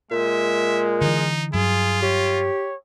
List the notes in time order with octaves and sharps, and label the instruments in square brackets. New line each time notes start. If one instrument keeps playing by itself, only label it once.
[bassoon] A#2 [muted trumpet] G#3 [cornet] E5
[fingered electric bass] D3 E3 [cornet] D#4
[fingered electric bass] G2 F#3 [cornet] F4 [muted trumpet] G#4
[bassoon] G4 [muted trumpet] C#5